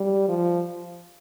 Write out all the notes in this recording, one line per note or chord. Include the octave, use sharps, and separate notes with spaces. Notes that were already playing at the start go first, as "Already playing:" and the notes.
Already playing: G3
F3